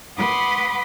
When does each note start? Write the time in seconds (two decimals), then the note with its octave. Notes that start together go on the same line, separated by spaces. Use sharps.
0.17 B4 F#5 B5 C6 D6 D#6